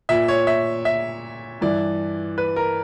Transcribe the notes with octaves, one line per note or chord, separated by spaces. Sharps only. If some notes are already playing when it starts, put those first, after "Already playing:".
A#2 E5
C#5
E5
E5
G2 E3 D5
B4
A#4